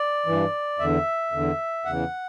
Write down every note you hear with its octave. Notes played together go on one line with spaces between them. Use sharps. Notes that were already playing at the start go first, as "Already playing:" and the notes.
Already playing: D5
G2 E3
E2 D3 E5
E2 D3
E2 C#3 E3 F#5